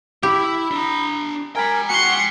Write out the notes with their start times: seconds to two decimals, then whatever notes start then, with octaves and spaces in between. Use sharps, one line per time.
0.23 E4 G4 B5
0.71 D4 A#5
1.56 A#4 G5 G#5 B5
1.89 F#4 F#5 G#5 C6 C#7